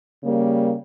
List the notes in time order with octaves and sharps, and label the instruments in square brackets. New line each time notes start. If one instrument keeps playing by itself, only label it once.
[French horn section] C#3 G3 A#3